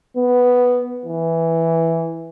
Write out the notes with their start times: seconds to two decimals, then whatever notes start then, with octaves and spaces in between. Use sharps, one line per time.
0.17 B3
1.05 E3